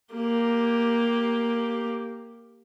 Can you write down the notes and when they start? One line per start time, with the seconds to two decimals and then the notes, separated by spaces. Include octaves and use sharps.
0.14 A#3 G4